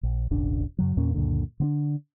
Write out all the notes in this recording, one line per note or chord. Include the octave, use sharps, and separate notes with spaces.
A#1
D#1 G#1 C#3 D4
F#2 C#3 F#3
E2 A#2 A#3 C#4
C#2 F#2 A#2 D3
D3 B3 D4